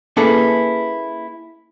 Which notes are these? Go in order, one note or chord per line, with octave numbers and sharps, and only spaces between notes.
A#3 C#4 E4 G#4 A4 B4